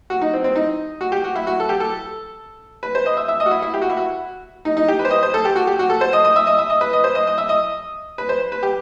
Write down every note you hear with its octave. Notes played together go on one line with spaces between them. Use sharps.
F#4
D#4
C4
C4
D#4
F#4
G4
F#4
E4
F#4
A4
G4
A4
B4
C5
D#5
E5
E5
D#5
F#4
E4
E4
G4
F#4
E4
F#4
D#4
D#4
G4
B4
C5
D#5
C5
A4
G4
F#4
G4
F#4
A4
C5
D#5
D#5
E5
D#5
E5
D#5
B4
D#5
C5
D#5
D#5
E5
D#5
B4
C5
B4
G4